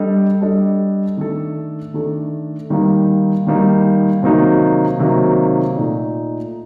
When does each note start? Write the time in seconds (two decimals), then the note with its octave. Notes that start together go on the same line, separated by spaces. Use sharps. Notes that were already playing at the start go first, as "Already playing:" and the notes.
Already playing: G3 D4 A4 D#5
0.41 G3 D4 A4 D#5
1.17 D#3 A3 D4 A4
1.94 D#3 A3 D4 A4
2.70 D#3 G3 A#3 D#4
3.47 D#3 G3 A#3 D#4
4.23 C3 D#3 F#3 A#3 D#4
4.99 C3 D#3 F#3 A#3 D#4
5.75 A#2 A3 D#4